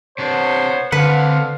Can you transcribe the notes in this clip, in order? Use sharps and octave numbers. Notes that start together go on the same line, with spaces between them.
C3 B3 D4 C5 C#5
D3 C4 D4 B4 F5 F#5